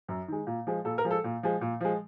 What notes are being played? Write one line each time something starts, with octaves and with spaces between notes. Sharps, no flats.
F#2
D#3 G#3
A#2
F3 G#3
A#2 A4
A#4
F3 G#3
A4
A#2
F3 G#3
A#2
F3 G#3